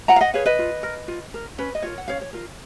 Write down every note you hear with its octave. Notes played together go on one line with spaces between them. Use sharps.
F4 F#5 A#5
F5
D#5 F#5
G#4 B4 C#5 F5
B4 D#5
F4
A#4
F4
A#4
C#4 B4
D#5
F4 A#4 C#5
F#5
C#4 C#5 F5
C#5
F4 A#4